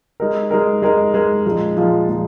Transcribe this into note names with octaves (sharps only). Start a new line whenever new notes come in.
G#3 D#4 A#4
G#3 D#4 A#4
G#3 D#4 A#4
G#3 D#4 A#4
A#2 F3 G#3 D#4
A#2 F3 G#3 D#4
A#2 F3 G#3 D#4